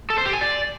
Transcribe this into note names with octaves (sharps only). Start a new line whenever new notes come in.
A4
C5
G4
G#5
D5